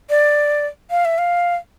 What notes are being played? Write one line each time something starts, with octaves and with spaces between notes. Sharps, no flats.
D5
F5
E5
F5